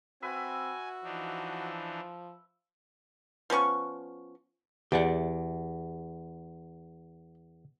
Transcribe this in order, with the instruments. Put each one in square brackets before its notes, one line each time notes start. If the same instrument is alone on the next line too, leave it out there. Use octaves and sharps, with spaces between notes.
[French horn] C4 [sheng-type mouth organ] F#4 [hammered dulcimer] B4 E5 [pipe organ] G#5
[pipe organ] E3 D4 D#4 [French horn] F3
[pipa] F3 B3 C#4 C#6
[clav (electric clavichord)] E2 [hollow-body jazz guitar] G4 D5 F#5